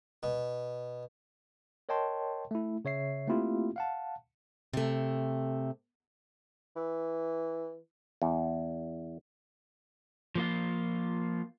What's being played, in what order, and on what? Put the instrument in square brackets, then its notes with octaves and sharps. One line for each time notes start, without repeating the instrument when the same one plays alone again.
[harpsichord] B2
[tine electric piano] A#4 C#5 D#5 G5 A5 C6
A3 E4
C#3 C#5 E5 C7
A3 A#3 C4 E4 F4 G4
F5 F#5 A5
[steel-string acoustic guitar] C3 A3
[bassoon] E3
[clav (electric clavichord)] E2
[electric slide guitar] F3 A#3 F4